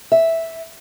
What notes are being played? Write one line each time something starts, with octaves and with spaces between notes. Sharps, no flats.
E5